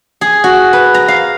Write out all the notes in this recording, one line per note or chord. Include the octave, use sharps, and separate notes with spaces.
G#4
F#4
B4
A#5
F5